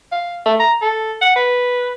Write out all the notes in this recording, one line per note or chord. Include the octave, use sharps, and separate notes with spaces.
F5
A3
A#5
A4
F#5
B4